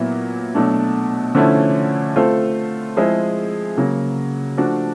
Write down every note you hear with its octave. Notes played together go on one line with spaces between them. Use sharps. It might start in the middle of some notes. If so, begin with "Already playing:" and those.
Already playing: A#2 F#3 B3 E4
B2 F#3 A3 D4
D3 F3 A3 C#4 E4
A3 C4 F4 A4
F3 G#3 C4 E4 G#4
C#3 F#3 A#3
F3 A3 D4 F#4